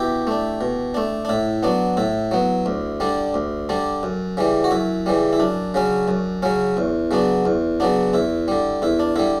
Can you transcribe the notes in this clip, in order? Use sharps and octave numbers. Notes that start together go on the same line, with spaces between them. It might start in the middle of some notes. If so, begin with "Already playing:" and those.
Already playing: B2 E4 G4
A3 D4
B2
A3 D4
D4
A2 E4
F#3 B3 D4
A2 E4
F#3 B3
D2
D3 G3 D4
D2
D3 G3 D4
F#2
C#3 E3 G3
F#4
F#2 E4
C#3 E3 G3
E4
F#2 D4
C#3 F#3 C#4
F#2
C#3 F#3 C#4
E2
C#3 F#3 B3 D4
E2
C#3 F#3 B3 D4
E2 E4
D3 G3
E2 E4
D4
D3 G3 E4